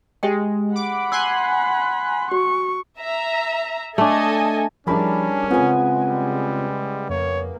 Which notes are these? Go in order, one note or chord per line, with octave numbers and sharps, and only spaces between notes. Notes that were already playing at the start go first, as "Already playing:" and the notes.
G#3 G4 D#5 G5
F#5 B5 D6
G#5 C6 E6 F#6
F#4 C#6
E5 A#5
A3 D4 A4 D#5 G#5
F3 G3 C#4 D4 E4 G#4 A#4 B5
C#3 G#3 B3 C4 F4 G#5
G3
F2 A#3 C#5